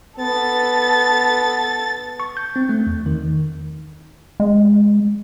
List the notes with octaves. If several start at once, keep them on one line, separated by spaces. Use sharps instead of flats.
B3 A4 A6
C#6
G6
C4
A3
E2
D#3
G#3